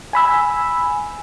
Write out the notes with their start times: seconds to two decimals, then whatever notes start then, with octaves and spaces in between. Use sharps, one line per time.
0.13 G#5 B5 E6